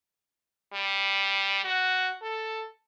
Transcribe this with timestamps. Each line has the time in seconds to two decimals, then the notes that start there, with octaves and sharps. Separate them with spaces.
0.74 G3
1.65 F#4
2.22 A4